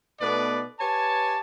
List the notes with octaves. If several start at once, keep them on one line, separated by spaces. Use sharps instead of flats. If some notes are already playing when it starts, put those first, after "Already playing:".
B2 A3 B3 D#4 B4 D5
G4 B4 C#5 G#5 A5